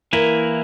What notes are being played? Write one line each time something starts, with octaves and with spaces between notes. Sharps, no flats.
E3 A#3 E4 A#4